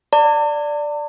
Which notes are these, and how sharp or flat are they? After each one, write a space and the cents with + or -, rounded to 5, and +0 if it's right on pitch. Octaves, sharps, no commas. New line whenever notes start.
D5 +0 A5 +45